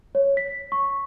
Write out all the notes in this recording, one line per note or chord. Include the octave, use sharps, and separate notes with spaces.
C#5
B6
C#6